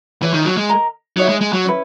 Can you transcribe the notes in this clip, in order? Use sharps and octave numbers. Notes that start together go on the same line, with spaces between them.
E3 E4 G#4 C#5
D#3
F#3
G#3
A#4 D#5 A#5
F#3 D#4 G#4 C#5 E5
G#3
G#3
F#3
C#4 E4 B4